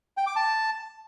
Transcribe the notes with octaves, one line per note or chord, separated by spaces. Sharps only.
G5
D6
A5